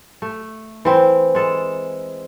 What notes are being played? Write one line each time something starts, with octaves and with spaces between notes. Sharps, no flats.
A3
E3 C4
G#3 A4